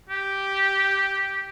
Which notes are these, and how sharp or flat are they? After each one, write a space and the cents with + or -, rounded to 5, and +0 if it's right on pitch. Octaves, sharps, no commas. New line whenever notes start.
G4 -5